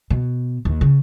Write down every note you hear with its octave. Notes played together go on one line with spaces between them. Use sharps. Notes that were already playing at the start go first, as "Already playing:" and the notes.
B2
D#2
C#3